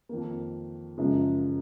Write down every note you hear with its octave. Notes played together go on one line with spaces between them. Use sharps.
F2 D#3 A#3
F#2 C#3 F3 G#3